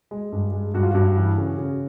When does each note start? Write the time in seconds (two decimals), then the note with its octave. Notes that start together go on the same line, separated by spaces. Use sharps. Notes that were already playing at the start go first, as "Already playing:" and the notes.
0.11 G#3
0.32 G2
0.53 G#3
0.74 G2 F#4
0.83 F4
0.91 G2 F#4
1.16 E3
1.38 C#3
1.58 C#3